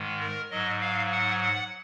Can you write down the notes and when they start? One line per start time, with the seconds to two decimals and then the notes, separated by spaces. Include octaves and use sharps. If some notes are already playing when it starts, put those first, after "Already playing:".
Already playing: G#2 D#3 G#3
0.20 A#4
0.50 G#2 F#3 D#5
0.81 F5
1.12 F#5
1.42 F#5